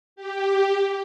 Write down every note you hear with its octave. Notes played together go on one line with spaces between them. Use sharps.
G4